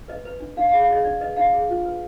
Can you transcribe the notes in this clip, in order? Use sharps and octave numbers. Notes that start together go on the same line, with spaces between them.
B4 D#5
B4
D4
D4 F5
F5
G#4
F5
G#4 D#5
D4 D5
B4 D#5
D4 F5
G#4
F4
B4